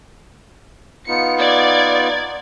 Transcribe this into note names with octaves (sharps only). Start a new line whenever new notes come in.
B3 D#4 F4 C#7
D5 G#6